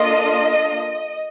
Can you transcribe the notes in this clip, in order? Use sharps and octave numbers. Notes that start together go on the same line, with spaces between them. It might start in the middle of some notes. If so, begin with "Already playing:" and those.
Already playing: A#3 D4 F4 A4 D#5